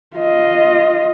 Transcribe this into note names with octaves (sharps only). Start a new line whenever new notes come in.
F4 D#5